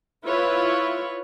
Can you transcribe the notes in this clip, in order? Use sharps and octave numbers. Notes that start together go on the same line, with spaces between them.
E4 F4 B4 C#5